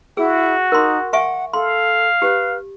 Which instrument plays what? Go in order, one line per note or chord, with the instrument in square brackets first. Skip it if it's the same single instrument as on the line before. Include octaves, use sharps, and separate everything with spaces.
[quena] E4 [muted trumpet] F#4 [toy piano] G#4
[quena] D#4 [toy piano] A#4 C6
[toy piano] E5 G#5 C#6 [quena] F#5
[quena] A4 [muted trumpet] F5 [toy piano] C6
[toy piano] G4 [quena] B4